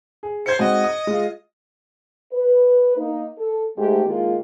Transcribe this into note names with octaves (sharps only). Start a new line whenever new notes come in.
G#4
C5 G#6 C#7
G#2 C4 F#4 D#5
D#6
G#3 F4
B4
A#3 D#4
A4
G#2 A3 G4
D#3 G#3 A#3 F4